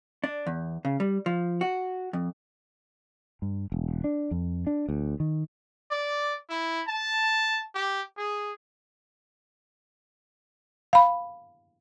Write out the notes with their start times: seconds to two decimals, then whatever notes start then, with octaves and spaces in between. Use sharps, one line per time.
0.24 D4
0.47 E2
0.85 C#3
1.00 G3
1.26 F3
1.61 F#4
2.13 F2
3.42 G2
3.72 E1
4.04 D4
4.31 F2
4.67 D4
4.89 D2
5.20 D#3
5.91 D5
6.50 E4
6.88 A5
7.75 G4
8.17 G#4
10.93 F5 B5